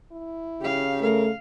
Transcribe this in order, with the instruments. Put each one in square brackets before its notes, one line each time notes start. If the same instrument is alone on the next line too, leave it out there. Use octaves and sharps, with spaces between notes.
[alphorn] E4
[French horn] C#3 [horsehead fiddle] G4 F5
[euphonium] A3 [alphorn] A#4 [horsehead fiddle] F5